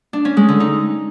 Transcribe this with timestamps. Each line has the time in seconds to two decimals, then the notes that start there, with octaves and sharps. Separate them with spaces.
0.13 D4
0.25 C#4
0.37 G#3
0.49 D3
0.60 D#4